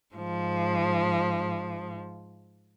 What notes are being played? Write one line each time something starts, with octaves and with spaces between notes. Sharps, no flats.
G#2 F3